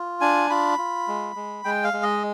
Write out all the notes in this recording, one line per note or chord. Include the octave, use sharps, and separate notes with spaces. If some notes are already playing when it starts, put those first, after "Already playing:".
Already playing: F4
D4 G#5
F4 B5
F4
G#3
G#3
G#3 G5
F5
G#3
D#5